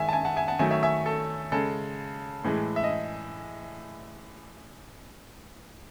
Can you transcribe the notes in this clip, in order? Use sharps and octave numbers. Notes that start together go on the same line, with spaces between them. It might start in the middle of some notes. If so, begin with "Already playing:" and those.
Already playing: D#3 G#3 E5 G#5
A5
E5 G#5
F#5 A5
E5 G#5
F#5 A5
D#3 F#3 A3 E5 G#5
C#5 E5
E5 G#5
A4
C#3 G#3 A4
A2 E3 G#3
E5
D#5